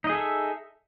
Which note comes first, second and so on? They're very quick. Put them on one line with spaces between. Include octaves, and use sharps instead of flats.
D#4 D#5 G#4 A4 E5